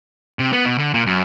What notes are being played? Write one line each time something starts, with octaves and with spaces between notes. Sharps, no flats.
C3
B3
B2
D3
A#2
F#2